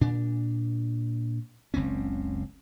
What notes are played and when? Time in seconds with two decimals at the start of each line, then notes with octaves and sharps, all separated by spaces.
0.01 A#2 D4
1.74 F#1 C#2 C4 C#4